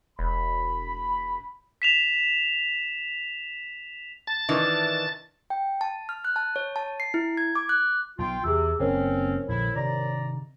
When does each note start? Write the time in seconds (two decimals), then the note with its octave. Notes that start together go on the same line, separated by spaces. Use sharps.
0.19 E1 B5
1.82 B6 E7 F7
4.27 A5 A6
4.49 D#3 E3 D4
5.50 G5
5.81 A5
6.09 F6
6.25 F#6
6.36 A5
6.56 C#5
6.76 A5
7.00 C7
7.14 E4
7.37 G#6
7.55 D6
7.69 F#6
8.19 B1 F4 G5
8.44 E2 C3 G#4 E6
8.80 F#1 C4 C#4 A#4 C5 C#5
9.49 A#1 D3 E4
9.76 C3 D#3 D5 A#5